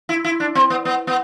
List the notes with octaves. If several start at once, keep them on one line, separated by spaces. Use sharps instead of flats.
E4
E4
D4
C4
B3
B3
B3